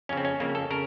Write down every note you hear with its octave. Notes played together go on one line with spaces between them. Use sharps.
F2 C#3 C4 C#4
C#4
F2 C#3 A#3
A4
C#3 A#4